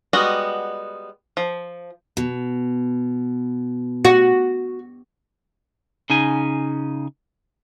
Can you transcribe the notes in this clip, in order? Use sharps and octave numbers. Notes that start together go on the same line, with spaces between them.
G3 G#3 B3 F#4 D#5
F3
B2
F#4
C#3 D#4 G#5